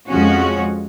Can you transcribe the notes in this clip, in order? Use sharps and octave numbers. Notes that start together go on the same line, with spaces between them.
F2 F3 G#3 C#4 F#4